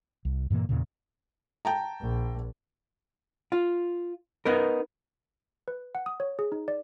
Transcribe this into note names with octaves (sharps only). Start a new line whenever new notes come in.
C2
G2 A#2 E3 A#3
E2 A#2 C#3
G5 A5 A#5
A#1
F4
B3 D#4 A#4
B4
F#5
D#6
C#5
G#4
D#4
D5